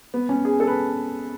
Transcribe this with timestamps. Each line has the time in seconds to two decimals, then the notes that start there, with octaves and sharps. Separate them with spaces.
0.14 B3
0.29 C#4
0.45 G#4
0.60 A4
0.67 B4